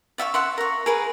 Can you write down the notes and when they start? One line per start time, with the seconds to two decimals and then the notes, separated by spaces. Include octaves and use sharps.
0.18 D5 E5 F5 C#6
0.34 E5 F#5 C6
0.58 A#4 C#6
0.86 G#4 A#4 B4